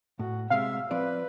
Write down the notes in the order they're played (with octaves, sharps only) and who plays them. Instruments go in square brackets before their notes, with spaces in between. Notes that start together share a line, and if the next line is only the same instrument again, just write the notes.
[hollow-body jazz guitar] A2 [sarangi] F#4
[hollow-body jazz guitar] C3 G#3 [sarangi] E5 [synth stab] F5
[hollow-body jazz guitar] F3 C4 D5 [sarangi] B4